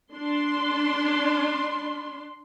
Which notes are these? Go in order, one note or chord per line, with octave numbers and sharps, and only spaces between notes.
D4 C6